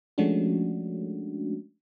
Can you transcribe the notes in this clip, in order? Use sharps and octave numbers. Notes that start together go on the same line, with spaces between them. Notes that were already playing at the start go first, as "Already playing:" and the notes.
F3 G#3 A3 C#4 D4 F#4